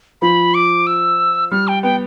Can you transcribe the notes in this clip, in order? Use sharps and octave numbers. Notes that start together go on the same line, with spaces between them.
F3 B5
D6
E6
G3 F6
G5
B3 G5